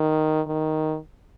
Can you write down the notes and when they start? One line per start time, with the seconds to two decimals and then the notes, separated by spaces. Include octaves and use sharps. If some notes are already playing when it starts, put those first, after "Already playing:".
Already playing: D#3
0.47 D#3